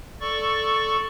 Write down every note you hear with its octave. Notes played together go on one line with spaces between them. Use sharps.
A4 D5 C#6